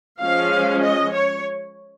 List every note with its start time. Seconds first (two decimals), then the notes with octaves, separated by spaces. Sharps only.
0.20 F3 G#3 C#4 F5
0.82 D#5
1.13 C#5